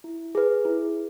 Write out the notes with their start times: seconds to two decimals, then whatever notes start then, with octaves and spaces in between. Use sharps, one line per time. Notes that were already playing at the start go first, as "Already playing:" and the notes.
0.04 E4
0.35 G#4 B4
0.65 E4